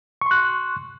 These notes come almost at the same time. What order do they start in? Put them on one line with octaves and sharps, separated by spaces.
C#6 C6 F#6